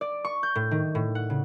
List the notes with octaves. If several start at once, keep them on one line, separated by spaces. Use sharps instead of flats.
D5
C#6
G6
A2
D#3
A2
F#5
C#3